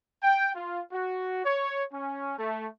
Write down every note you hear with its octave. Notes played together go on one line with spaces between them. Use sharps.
G5
F4
F#4
C#5
C#4
A3